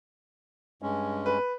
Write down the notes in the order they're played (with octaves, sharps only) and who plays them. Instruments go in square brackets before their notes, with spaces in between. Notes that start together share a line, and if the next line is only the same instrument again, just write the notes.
[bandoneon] G2 G#3 C#4
[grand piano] B4